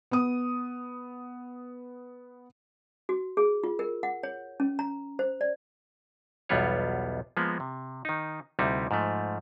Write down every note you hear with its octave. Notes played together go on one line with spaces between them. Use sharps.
B3 D#6
F#4
G#4
F4
A#4
F#5
C#5
C#4
A#5
C5
D5
B1 E2 G3 B3 F4 C#5
F3 G#3 A#3 B3
C3
D#3 D#4
D2 C3 G3 D#4 E4
G#2 F3 A3